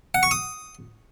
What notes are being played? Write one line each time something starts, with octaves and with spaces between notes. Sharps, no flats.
F#5
C#6
D#6